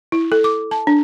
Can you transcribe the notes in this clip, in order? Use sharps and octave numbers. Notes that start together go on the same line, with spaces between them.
E4
A4
D6
A5
D4